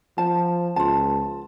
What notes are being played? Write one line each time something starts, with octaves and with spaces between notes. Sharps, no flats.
F3 A5
C#2 F4 A5